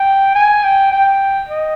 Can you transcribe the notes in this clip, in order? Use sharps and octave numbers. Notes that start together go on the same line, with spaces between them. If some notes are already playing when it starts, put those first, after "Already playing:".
Already playing: G5
G#5
G5
G5
D#5